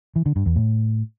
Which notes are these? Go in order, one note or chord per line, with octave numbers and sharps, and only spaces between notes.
E3
D3
G2
E2
A2